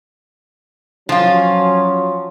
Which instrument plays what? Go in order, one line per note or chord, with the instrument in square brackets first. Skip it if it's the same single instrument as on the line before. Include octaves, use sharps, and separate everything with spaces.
[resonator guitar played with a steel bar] F3 F4 [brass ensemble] F#3 C#4